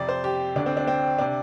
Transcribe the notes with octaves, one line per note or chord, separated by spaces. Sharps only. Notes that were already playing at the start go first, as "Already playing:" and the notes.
Already playing: F2 C3 D5
C5
G4
D2 D3 D4
C4
D4
C4
C3 D4